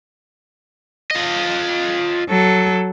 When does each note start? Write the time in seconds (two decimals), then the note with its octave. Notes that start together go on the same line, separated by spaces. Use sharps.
1.11 F4 D#5
2.28 F#3 A4